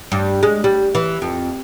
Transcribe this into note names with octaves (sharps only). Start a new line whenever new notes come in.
G2
G#3
G3
E3
F2